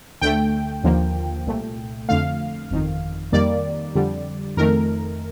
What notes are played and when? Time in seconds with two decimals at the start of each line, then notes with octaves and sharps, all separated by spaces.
0.21 D2 D3 A3 G5
0.84 D#2 D3 F3 A#3
1.46 C2 A#2 A3
2.09 F2 D3 A3 F5
2.71 G1 F2 D#3
3.32 F2 D#3 G3 A#3 D5
3.95 F2 D3 G3
4.57 F2 D#3 A3 A#4